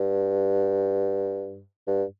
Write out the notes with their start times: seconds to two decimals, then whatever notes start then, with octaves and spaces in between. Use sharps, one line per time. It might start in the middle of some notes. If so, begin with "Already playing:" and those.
Already playing: G2
1.87 G2